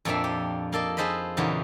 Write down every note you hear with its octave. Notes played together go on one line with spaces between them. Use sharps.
F2 A#2 F3 D4 E5
G4
A#3 A4 D5 D#5
F4 G#4 A4 C5 D#5 B5
E2 A#2 C#3 F#3 B3 D#4